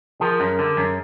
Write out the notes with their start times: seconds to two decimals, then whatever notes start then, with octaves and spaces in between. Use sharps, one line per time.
0.21 F3 G#4 A#4
0.40 F#2
0.59 D3
0.77 F#2